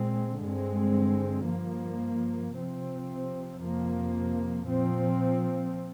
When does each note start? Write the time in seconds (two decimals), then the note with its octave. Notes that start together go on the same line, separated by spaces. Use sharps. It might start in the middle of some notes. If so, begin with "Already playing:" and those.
Already playing: A#2 G#3 C4
0.37 G2 D3 G#3 C4
1.44 G2 F3 A#3
2.52 C3 F3 C4
3.58 F2 C3 F3 A#3
4.66 A#2 F3 C4